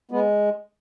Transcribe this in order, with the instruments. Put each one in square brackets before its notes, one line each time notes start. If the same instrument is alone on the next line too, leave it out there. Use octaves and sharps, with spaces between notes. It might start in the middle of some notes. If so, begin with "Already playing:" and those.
[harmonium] G#3 B3